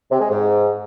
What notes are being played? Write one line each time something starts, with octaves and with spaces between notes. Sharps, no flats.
C3
G#3
G#2